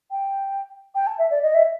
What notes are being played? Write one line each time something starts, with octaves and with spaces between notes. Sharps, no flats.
G5
G5
A5
E5
D5
D#5
E5